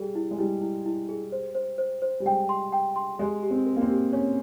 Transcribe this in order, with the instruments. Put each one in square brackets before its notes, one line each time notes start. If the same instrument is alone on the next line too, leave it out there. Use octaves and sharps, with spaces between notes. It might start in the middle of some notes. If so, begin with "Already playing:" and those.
Already playing: [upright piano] G3 [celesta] G#4
[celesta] E4
[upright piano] G#3
[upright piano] G3 [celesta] E4
[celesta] E4
E4
G#4
C5
C5
C5
C5
[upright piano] G3
[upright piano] G#3 [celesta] G5
[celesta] C6
G5
C6
[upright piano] G#3 [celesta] G4
[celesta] G4
[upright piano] C4
[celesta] A#4
[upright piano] A#3
C4
[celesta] G4
[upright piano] C#4 [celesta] C#5